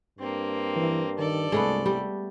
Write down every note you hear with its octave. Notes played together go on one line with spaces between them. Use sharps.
G2 A#3 C4
E3
D#3 A4 D5
C2 G#3 A3 B3
G3